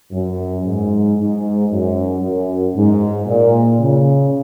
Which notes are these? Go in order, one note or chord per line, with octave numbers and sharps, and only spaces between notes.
F#2
G#2
G#2
F#2
F#2
G#2
A#2
C#3